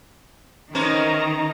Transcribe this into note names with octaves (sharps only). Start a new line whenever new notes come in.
D#3 E3 C#4 C5 D#5 A#5